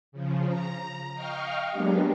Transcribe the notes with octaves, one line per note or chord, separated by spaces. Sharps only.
C#3 F3
A#5
D#5 F5 G5 C#6 F6
F#3 G#3 A#3 B3 D4 G4